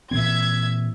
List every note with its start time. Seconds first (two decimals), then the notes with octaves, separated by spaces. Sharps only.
0.11 A#2 E3 C4 E5 G#6